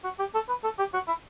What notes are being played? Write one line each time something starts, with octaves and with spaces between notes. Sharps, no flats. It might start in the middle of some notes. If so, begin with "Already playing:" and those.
F#4
G4
A4
B4
A4
G4
F#4
E4